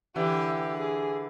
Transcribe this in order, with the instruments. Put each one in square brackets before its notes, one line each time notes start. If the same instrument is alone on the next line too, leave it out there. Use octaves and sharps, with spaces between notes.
[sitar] D3 E3 [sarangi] G4
[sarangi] G#4